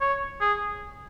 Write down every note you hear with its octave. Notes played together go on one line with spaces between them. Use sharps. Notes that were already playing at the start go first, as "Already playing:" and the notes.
C#5
G#4